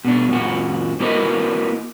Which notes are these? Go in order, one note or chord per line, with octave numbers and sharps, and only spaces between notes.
B2 D4
F#2 A#2 F#4
A#3 E4 F#4 A#4 B4 D#5